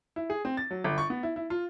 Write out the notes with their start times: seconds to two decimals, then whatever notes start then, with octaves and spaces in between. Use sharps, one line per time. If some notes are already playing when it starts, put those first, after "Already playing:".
0.16 E4
0.30 G#4
0.45 C4
0.57 A6
0.71 F#3
0.84 G1
0.98 C#6
1.10 B3
1.23 E4
1.36 E4
1.50 F4